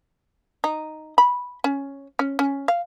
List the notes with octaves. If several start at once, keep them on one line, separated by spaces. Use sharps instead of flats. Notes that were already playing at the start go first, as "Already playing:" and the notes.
D#4
B5
C#4
C#4
C#4
F5